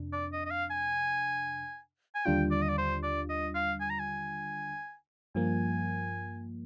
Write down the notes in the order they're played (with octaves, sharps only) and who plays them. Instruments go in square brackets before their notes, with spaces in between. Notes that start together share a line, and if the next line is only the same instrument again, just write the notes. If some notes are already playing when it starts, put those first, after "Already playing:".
Already playing: [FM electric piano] F2 C3 D4
[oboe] D5
D#5
D#5
F5
G#5
G#5
[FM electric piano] D#2 D3 G3 D4 F4 [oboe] G5
[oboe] D5
D#5
D5
C5
D5
D#5
F5
G#5
A#5
G#5
[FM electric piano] G2 F3 A#3 [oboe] G#5